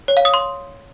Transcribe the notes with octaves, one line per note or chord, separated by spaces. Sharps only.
C#5
F5
D#6
C6